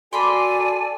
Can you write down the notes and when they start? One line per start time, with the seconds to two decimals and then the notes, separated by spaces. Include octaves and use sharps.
0.13 A#3 F#4 A4 D5 G#5 B5 C6